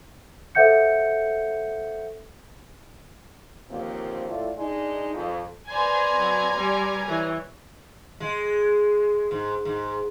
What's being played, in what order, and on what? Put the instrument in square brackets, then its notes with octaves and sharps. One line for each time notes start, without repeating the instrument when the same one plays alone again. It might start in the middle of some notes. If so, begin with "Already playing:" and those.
[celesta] A4 C5 E5 F#5 G6 C#7
[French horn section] D#2 D3 F3 A#3 C4
A2 F4 A4 D5
G#3 D4 D#4
F2
[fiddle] B4 D5 [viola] C5 [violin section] G#5 A#5 [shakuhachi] C6
[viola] F#3 C4
[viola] G3 G4 [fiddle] B4 D5
[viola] E3 C#5
[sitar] G#3
G#2
G#2